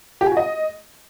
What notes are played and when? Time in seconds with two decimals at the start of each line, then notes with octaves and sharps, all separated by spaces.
0.21 G4
0.26 G#5
0.31 F#4
0.37 D#5